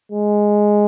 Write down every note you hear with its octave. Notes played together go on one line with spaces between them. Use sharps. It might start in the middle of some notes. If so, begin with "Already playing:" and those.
G#3